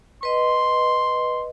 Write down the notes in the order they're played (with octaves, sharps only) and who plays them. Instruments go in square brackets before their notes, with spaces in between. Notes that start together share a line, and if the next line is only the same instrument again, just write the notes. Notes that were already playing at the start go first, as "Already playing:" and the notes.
[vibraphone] B4 D#5 [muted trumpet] C6